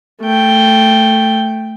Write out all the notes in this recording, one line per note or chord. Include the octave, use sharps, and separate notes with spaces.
A3 G5